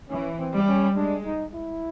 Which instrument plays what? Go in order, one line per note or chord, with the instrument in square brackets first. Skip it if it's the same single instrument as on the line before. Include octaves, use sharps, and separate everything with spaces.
[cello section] E3 [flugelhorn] C#4
[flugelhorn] C4
[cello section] G3
[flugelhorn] C#4
[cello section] G#3 [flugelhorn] D4
[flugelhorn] D#4
E4